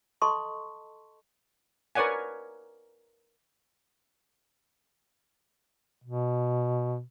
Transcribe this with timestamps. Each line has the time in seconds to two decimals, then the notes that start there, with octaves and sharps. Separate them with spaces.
0.22 A4 D#5 A5 C6 C#6
1.95 A#4 B4 C#5 D5 F#5 G#5
6.04 B2